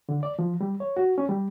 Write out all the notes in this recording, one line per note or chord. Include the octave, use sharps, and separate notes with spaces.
D3
D5
F3
G3
C#5
F#4
C#4
G3